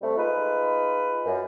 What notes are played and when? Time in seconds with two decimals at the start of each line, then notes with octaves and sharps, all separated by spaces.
0.01 C3 G3 A3
0.17 G#3 D#4 F4 B4
1.24 F#2